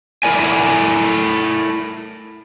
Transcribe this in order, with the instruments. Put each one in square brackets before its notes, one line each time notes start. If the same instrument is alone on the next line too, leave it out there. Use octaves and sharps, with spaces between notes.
[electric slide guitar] A3 E4 A#4 D5 G#5